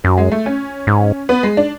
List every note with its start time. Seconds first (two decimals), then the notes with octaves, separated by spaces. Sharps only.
0.04 F#2 F#3
0.18 G#3
0.32 A3
0.46 C#4
0.87 G#2
1.29 B3
1.43 G#3
1.57 D4